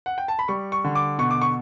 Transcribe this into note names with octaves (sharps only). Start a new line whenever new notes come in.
F#5
G5
A5
B5
G3 C#6
C#6
D3
D6
B2 C#6
D6
C#6